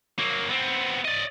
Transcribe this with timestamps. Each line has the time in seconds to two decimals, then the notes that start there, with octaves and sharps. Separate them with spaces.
0.19 F#3 A#3
0.49 B3 C4
1.05 D5 D#5